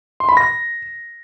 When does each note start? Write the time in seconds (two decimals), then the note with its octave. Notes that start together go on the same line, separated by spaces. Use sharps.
0.20 C6
0.29 B5
0.37 A#6